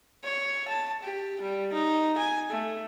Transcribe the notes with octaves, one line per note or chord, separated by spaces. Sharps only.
C#5
A5
G4
G3
D#4
G#5
A3